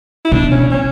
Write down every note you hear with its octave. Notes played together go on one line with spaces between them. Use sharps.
E4
B2 D4
C#4
C#4